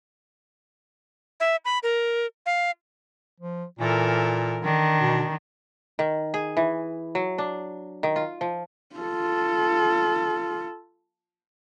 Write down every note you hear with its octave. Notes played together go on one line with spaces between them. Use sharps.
E5
B5
A#4
F5
F3
A#2 E3 A4 A#4
D#3 D4
B2
D#3
G#4
E3
F#3
D4
D#3
F4
F3
F4 A4